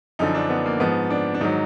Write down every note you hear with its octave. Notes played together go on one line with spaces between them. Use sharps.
F#2 D3 F3 D#4
D4
B3
A#3
G#2 F3 B3
D4
D4
G#2 D#3 F#3 D#4